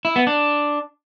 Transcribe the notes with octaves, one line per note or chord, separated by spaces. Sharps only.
E4
B3
D4